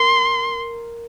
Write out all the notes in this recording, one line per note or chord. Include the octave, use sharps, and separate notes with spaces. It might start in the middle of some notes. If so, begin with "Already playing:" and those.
Already playing: A#4 C6